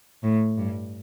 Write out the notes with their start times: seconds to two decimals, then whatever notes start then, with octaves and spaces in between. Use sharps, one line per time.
0.23 A2
0.58 G2